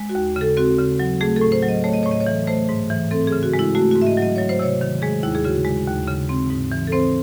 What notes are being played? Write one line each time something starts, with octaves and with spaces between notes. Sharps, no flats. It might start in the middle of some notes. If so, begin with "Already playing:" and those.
Already playing: G#3
F#4
D#2
C#3 A4
C4 F#4
C#3
F#3
A3 G#4
A4
A2
C5
F#3
D#5
A3 C#5
D#5
A2 C#5
D#5
C#5
E3
A3 C5
G#2
E3
C4 A4
G#4
C#3
F#4
G#3
E4
A3 F#4
F#4
G#2
E5
D#5
F#3 D#5
F#3 C#5
C5
C3 C#5
D#3
G#3 G#4
D#2 E4
G#4
C#3 F#4
G#3
D#2
C#3
C4
G#2
E3
A4
C4 C5